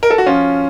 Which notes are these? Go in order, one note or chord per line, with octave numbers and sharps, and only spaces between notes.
A#4
A4
F#4
F3 C#4 F4